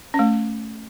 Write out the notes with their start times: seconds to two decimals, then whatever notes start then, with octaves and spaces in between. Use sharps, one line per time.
0.14 C#4
0.19 A3